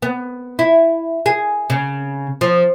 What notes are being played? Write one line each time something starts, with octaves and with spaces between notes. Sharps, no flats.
B3
E4
G#4
C#3
F3